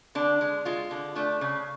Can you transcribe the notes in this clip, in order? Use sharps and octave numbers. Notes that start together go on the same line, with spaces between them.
D3 D4
G#3
G#3 F4
D3
A3 D4
C#3